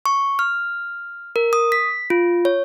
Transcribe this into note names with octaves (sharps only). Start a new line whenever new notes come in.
C#6
F6
A#4
D#6
B6
F4
C#5